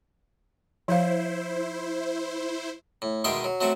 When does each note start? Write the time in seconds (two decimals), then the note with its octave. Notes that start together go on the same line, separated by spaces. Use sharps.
0.88 F3 E4 C5 F5
3.02 A2
3.24 B2 D#3 G#3 E5 G5 C6
3.44 F#3
3.61 F#3 A3 C4 F#4